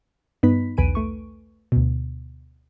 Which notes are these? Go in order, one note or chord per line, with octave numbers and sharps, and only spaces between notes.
G2 B3 D#4 B4 B5 B6
B1 E2 B4 G#5 D7 D#7
A3 C#6
D2 B2